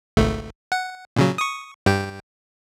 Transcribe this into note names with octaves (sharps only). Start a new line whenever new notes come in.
G#1 C#2 A3
F#5
A#2 C#3 F#3
C#6 D#6
G2 G4 G5